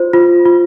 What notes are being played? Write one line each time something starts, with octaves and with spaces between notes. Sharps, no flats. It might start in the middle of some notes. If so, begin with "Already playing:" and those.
Already playing: F4 C5
F4
F4